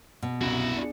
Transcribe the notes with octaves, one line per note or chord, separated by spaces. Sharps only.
B2
C2 F#2 E4 F#4
D4 G#4